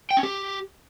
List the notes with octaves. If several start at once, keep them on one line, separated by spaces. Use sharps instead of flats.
G5
C#4
G4